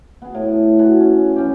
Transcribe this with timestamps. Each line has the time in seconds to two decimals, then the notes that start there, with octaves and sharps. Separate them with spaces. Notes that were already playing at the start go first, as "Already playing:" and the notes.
0.22 B3 G#4
0.34 A2
0.79 B3 F#4 G#4
1.00 C#4
1.36 E3 C#4 G4